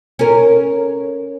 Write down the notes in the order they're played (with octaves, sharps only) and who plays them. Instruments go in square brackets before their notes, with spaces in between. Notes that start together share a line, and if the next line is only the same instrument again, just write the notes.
[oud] C#4 A#4